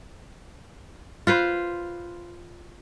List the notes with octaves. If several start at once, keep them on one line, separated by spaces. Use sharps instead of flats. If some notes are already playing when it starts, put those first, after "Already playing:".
F4 B4 C5